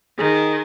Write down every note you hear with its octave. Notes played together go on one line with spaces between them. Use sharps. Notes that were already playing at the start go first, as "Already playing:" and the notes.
D#3 G#4